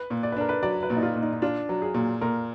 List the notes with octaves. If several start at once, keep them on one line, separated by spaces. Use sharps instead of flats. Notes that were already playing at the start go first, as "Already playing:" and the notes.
Already playing: B4
A#2
D5
B4
D4 A#4
B4
F#3 D5
B4
A#2
D#4
F4
A#2
D#4
D#4
D4 F4
F#3
G#4
A#2
A#2 A#4